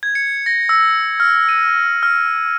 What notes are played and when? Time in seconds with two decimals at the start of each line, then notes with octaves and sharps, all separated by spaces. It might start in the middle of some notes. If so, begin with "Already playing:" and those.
0.03 G#6
0.15 C#7
0.46 A#6
0.69 E6
1.20 F6
1.49 D#7
2.03 F6